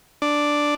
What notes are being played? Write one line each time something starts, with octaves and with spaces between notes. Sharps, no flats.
D4